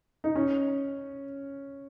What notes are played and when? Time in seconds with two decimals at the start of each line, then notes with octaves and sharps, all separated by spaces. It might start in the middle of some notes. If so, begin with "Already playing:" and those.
0.24 D#4
0.35 C#4